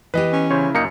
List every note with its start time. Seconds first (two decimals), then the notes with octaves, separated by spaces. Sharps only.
0.14 E3 B3 G4 B4 D#5
0.32 C#4
0.51 C#3 E4 C5 C#5
0.75 F#2 A#3 D#4 C#7